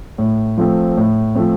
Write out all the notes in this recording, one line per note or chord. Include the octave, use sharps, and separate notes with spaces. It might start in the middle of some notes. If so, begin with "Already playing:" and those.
A2
F3 A3 C4
A2
F3 A3 C4